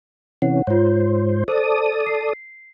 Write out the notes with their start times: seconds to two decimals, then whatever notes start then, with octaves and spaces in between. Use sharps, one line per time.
0.42 C3 E3 C#4 F#5
0.67 G#2 F4 C5 C#5
1.48 A4 C5 D5 D#6
2.06 C7